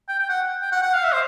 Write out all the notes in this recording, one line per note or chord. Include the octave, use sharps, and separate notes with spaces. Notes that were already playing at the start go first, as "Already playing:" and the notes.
G5
G5
F#5
G5
F#5
F#5
F5
E5
C5